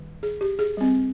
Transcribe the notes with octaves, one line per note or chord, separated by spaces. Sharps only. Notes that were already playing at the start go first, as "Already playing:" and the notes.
Already playing: D#3 G3
G#4
G4
G#4
G3 C4